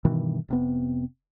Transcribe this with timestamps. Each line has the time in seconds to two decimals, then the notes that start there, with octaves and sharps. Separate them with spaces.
0.05 G2 B2 D#3 E3
0.48 F1 C3 B3